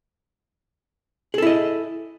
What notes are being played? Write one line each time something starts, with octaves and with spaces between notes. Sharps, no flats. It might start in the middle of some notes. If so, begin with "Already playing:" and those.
E4 G#4 A4 D#5